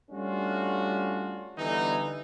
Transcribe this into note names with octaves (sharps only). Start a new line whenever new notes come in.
G3 A3 C#4 D4 F4 F#4
D3 E3 G3 B3 D#4